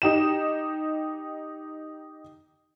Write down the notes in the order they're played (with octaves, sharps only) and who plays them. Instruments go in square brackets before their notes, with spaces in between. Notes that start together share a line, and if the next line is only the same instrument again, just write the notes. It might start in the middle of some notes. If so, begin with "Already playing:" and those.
[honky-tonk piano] D#4 G4 E7